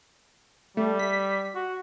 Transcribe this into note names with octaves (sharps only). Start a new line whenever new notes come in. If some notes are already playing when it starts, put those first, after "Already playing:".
G3 A3
B6
F#4